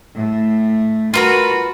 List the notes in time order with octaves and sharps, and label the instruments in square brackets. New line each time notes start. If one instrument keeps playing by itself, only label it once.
[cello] A2 A3
[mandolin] F4 A#4 B4 [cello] F#4